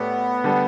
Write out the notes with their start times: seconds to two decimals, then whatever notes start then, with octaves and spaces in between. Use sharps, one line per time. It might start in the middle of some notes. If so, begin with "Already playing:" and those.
Already playing: A2 A3 B3 G4 D5
0.44 D3 G3 D4 A4